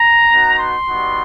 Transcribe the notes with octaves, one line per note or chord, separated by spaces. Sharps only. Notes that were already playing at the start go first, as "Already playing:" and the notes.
Already playing: A#5
B3 D#4 F#4
C6
G3 B3 D#4 F#4